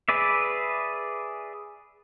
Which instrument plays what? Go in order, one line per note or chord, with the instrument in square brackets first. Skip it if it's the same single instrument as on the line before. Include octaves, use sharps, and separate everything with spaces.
[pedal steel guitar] G#4 B4 D5 E5